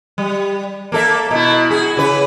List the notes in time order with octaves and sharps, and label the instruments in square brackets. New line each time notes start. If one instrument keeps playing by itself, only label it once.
[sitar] G3
A#3 A4 E5
B2 E4
F#4 G#4
C#3 B4